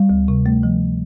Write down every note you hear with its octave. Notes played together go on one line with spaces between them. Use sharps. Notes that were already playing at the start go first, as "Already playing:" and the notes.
Already playing: G3
D2
C3
A3
F3